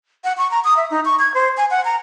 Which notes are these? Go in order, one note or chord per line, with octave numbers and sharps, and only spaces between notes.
F#5
C#6
A#5
D#6
E5
D#4
C#6
G#6
C5
G#5
F#5
A#5